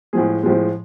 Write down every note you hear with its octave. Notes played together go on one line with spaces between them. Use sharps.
A2 F3 G#3 G#4
A2 F3 G#3